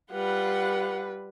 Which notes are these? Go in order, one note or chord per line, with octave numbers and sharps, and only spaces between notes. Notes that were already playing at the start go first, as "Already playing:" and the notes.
G3 F4 B4 F#5